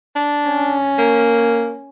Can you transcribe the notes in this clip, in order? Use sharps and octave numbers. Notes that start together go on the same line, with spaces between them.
D4
C#4
A#3